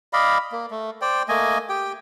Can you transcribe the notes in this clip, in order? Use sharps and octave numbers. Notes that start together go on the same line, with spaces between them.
D5 D#5 F5 B5
A#3
A3
C5 D5 G5
A3 A#3 D#5 G#5
G4 G5